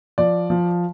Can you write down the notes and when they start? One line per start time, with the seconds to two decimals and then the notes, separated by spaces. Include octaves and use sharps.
0.18 F3 D5
0.50 F3